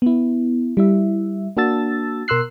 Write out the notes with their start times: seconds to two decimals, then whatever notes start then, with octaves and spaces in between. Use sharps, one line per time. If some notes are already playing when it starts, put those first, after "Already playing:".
0.02 B3 E4
0.77 G3 E4 E5
1.57 A#3 D4 F#4 A5 E6 A6
2.28 B2 A#4 C6 E6 F#6 C7